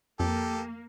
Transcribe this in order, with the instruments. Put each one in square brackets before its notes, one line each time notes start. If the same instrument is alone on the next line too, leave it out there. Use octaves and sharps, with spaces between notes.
[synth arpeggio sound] F2 [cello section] A#3 [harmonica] G4 A4